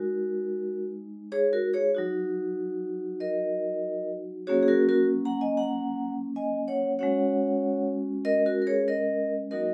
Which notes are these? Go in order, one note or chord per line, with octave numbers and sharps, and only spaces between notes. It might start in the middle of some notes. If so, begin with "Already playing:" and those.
Already playing: G#3 D#4 F#4 A#4
G#4 C#5
F#4 A#4
G#4 C#5
F#3 D#4 F#4
A#4 D#5
F#3 A#3 C#4 F#4 G#4 C#5
G#4
F#4 A#4
F#4 A#4
F#5 A#5
D#5 G#5
F#5 A#5
D#5 G#5
C#5 F#5
G#3 C#4 F#4 C#5 F#5
A#4 D#5
F#4 A#4
A#4
G#4 C#5
A#4 D#5
F#3 A#3 D#4 F#4 A#4 D#5